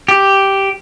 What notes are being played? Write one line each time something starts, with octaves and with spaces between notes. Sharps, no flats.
G4